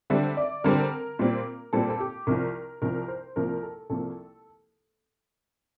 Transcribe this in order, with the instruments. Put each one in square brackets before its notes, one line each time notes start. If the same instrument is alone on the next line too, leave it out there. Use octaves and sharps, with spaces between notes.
[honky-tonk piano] D3 G3 C4 E5
D5
D3 G3 C4 A#4
A#2 G3 C4
A#2 G3 C4 A4
A4
G4
C2 C3 F3 A#4
C2 C3 F3 A#4
C5
C2 C3 F3 A#3 A#4
A4
C2 C3 F3 A#3 A4